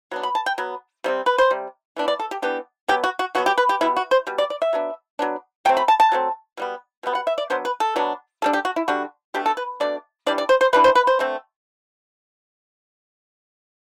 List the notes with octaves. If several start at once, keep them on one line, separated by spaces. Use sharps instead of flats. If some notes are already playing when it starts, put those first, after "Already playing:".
F#3 B3 D4
B5
A5
G5
F#3 B3
C3 G3 C4
B4
C5
C3 G3
E3 B3 D4
D5
A4
G4
E3 B3 D4 G4
B2 F#3 B3 G4
F#4
F#4
B2 F#3 B3 F#4
G4
B4
G4
B2 G3 B3 E4
F#4
C5
B2 G3
D5
D5
E5
F#3 B3 D4
F#3 B3 D4
F#3 A3 C4 G5
B5
A5
A5
F#3 A3 C4
B2 G3 B3
B2 G3 B3
F#5
E5
D5
B2 F#3 B3 D4 C5
B4
A4
B2 F#3 B3 D4
D3 G3 D4 A4
G4
F#4
E4
D3 G3 D4 F#4
B2 A3 D4 G4
A4
B4
B2 A3 D4 D5
E3 G3 D4 D5
D5
C5
C5
E3 G3 D4 B4
C5
B4
C5
D3 A3 C4